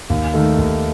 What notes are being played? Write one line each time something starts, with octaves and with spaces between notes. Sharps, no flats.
D#2
D#3 A3
D#2